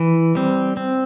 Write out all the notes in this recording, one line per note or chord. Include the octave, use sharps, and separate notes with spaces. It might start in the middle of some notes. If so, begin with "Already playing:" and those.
Already playing: E3
G3 C4
C4